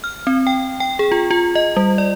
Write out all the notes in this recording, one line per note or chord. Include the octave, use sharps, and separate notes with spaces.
F6
C4
G5
G5
G#4
F4
F4
D#5
G3
D5